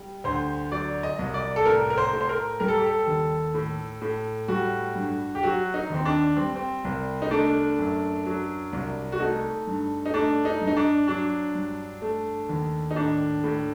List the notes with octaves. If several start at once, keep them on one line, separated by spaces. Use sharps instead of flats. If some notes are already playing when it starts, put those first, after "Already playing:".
Already playing: G3
D2 C5
F#3 D5
D#5
C2
D5
A4
A2 A#4
A#4
C5
A2
C5
A#4
G3 A#4
A4
G4
A4
D#2
A2
A2
G3 F#4
G2
G4
F#3 F#4
D#4
D#2 C4
D4
G3 C4
C4
C2
D#4
A3 D4
F#2
F#3
C2
F#4
A3 D#4
G2
D#4
A3 D4
D#4
G2
D#4
D4
F#3 D4
G2
A3
D#2
D#4
A2 D4
A2